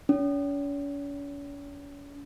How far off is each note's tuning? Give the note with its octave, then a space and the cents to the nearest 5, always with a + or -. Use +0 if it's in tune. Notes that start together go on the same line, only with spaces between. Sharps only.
C#4 +40